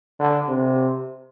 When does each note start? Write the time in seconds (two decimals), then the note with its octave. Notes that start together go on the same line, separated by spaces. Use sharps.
0.19 D3
0.48 C3